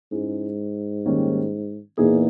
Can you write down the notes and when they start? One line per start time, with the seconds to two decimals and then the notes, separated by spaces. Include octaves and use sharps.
0.12 G#2 G#3 C#4 E4 G#4
1.05 D#3 G3 A#3 C#4 G4
1.98 E2 A#2 A#3 D#4 G#4